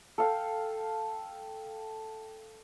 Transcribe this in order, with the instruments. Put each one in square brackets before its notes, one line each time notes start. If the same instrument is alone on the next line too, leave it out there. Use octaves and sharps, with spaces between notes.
[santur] A4 F5 G5